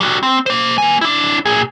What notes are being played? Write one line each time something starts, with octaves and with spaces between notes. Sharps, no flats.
G3 F#4
C4
A#3 C5
A#3 G#5
D4 E4
A#2 G#4